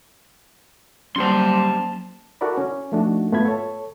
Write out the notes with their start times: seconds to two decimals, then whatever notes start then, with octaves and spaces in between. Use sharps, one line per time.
1.16 F#3 G3 A#3 C#4 G4 C5 A5 C6
2.41 E4 F#4 A4 A#4 D5 B5
2.57 C#4
2.92 F3 A3 D4 D#4 F#4
3.32 G#2 A3 B3 F4 B5 G#6
3.45 A4 C#5